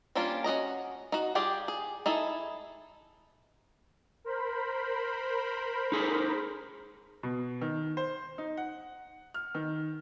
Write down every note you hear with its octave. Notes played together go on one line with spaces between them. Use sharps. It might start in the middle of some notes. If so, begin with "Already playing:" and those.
G3 A#3 C#4 D4 F4
C#4 F#4 D#5 A#5
D#4 F#4
G3 F4 G4 G#4 D5
G#4
D#4 E4 G#4 A4
A#4 C5 B5
D#4 G#4 A4
B2
D#3
C5
D#4
F#5
F6
D#3